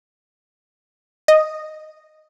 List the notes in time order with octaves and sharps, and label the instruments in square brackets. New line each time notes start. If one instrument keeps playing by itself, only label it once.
[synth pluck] D#5